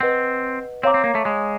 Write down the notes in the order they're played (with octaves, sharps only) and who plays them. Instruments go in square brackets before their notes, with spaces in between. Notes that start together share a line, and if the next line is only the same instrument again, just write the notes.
[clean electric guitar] C4 [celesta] B4 D#5 F#5
[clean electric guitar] C4 [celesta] C#5 F5 A#5 D6
[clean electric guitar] C4
A#3
A3
G#3